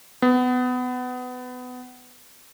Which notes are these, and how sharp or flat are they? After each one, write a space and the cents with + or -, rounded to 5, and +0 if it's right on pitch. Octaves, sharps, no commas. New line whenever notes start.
B3 +20